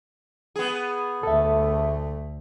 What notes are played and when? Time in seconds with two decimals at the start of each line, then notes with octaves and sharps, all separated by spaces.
0.56 B3 G#4
1.23 D2 A3 A4 E5